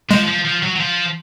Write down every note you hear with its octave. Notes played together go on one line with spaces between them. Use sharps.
F3 G#3
F3
F3
F#3
F#3
F3